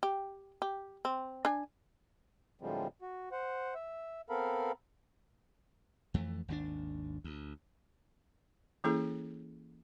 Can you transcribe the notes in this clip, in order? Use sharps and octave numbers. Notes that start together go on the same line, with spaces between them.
G4
G4
C4
D4 G#5
A2 D3 F3 G3 G#3 C4
F#4
C5 F#5
E5
B3 C4 A4 A#4 F5 B5
F2 E3 A3
G#1 D#2 B2 D4
D2
E3 A#3 C#4 E4 G#4 A4